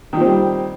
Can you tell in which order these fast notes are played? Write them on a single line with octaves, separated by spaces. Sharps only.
D#3 A#2 C4 G3